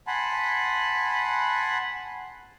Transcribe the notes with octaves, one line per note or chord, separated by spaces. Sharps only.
F#5 G#5 A5 B5 C6